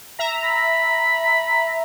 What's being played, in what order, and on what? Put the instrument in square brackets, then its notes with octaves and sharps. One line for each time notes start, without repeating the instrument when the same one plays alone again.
[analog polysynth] E5 A#5
[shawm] B5